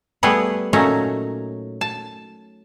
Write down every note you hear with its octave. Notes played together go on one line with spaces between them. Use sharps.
G3 A3 B3 G#4 B4 F#5
A#2 F#3 A3 C#4 D#4 A#5
A5